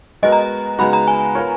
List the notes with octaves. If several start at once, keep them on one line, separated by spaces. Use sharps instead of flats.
G#3 B3 F#4 A#4 D#5
A#5
C#3 G#3 B3 D#4 F#4 B5
A#5
G#5
B3 F4 A#4 C#5